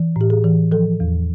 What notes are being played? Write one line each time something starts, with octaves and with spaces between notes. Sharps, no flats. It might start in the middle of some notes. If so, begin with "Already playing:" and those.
Already playing: E3
A2 G4
G#4
E3
F3 A4
E2